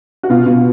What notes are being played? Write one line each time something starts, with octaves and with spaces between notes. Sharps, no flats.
F#4
B2 F4
B2